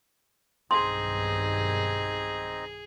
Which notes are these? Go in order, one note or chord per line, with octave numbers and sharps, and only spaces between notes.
B1 G2 D#3 C4 D#4 G#4 D#5 C6